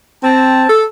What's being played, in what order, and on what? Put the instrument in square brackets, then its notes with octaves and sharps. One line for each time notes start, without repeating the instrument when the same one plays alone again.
[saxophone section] C4 [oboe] A5
[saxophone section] A4